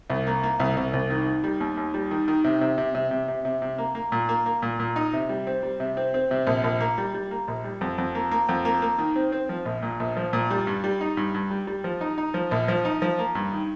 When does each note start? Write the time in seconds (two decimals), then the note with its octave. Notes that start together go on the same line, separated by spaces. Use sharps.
0.10 C2
0.27 A#3
0.43 A#3
0.60 C2
0.77 C2
0.93 C2
1.10 D#3
1.26 D#3
1.44 G3
1.60 D#2
1.77 D#2
1.94 G3
2.11 D#3
2.28 D#3
2.44 C3
2.61 C3
2.78 C3
2.95 C3
3.11 C3
3.28 C3
3.45 C3
3.62 C3
3.78 A#3
3.95 A#3
4.12 A#2
4.29 A#3
4.46 A#3
4.62 A#2
4.80 A#2
4.96 D#4
5.13 C3
5.29 G3
5.47 C4
5.63 G3
5.80 C3
5.97 C4
6.14 C4
6.31 C3
6.47 A#1
6.64 A#1
6.80 A#3
6.98 G3
7.14 G3
7.31 A#3
7.48 A#1
7.64 G3
7.81 F2
7.98 F2
8.15 A#3
8.31 A#3
8.49 F2
8.65 A#3
8.82 A#3
8.99 D#3
9.16 C4
9.32 C4
9.49 F3
9.65 A#1
9.82 A#2
10.00 A#1
10.17 F3
10.33 A#2
10.50 G3
10.67 G2
10.84 G3
11.01 D#4
11.17 G2
11.34 G2
11.51 G3
11.67 G3
11.84 F3
12.01 D#4
12.18 D#4
12.34 F3
12.51 A#1
12.68 F3
12.85 D#4
13.02 F3
13.19 A#3
13.35 G2
13.52 D#3